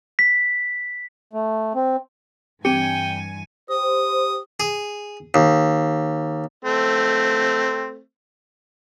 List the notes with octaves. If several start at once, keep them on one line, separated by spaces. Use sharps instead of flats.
B6
A3
C4
G2 E3 C4 G4 G5 G#5 C#7 D#7
G4 C5 D#6
G#4
D#2
A3 C4